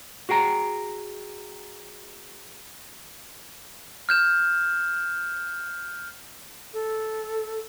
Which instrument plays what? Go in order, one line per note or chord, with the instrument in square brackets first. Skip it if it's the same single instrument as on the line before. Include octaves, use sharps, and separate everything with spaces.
[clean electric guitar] F#4 G#4 G5 A#5
[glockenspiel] F6 G6 E7
[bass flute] A4